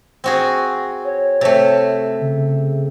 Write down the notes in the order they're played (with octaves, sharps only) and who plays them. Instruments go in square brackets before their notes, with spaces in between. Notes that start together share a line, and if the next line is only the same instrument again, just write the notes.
[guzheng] C4 F#4 G#4
[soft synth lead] C#5
[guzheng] C3 A3
[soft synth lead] C#3